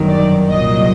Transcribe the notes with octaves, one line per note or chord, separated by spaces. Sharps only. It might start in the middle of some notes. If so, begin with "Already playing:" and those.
Already playing: G1 F#2 D#3 F#3
D5
C2 A#2 F#3 D#5